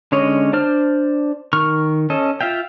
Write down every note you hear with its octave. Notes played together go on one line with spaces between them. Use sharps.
D3 G#3 C#4 C#5 D#5
D4 C5 D5 F6
D#3 C#6 F6
C#4 A4 D#5
F4 E5 F5 G5